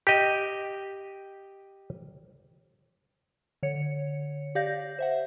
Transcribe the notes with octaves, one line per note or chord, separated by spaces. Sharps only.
G4 D#5
D3 C#5 C#7
G4 D5 F5 G6 A#6
C5 E5 F#5